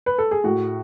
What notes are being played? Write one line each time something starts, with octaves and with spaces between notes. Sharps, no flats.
B4
A4
G#4
A2 F#4